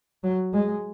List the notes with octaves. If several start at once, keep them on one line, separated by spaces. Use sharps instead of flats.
F#3
G#3